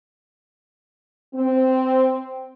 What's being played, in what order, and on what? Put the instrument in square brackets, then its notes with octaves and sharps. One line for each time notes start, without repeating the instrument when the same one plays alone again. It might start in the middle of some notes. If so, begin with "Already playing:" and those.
[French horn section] C4